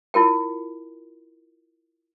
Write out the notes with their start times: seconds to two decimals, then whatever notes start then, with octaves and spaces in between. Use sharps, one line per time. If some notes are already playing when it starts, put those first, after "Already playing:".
0.14 E4 F4 A#4 G5